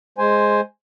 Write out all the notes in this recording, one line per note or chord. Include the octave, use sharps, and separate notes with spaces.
G#3 C5 G#5